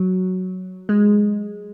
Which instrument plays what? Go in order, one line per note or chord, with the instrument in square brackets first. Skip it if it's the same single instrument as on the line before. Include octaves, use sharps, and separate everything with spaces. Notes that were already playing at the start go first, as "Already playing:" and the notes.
Already playing: [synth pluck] F#3
G#3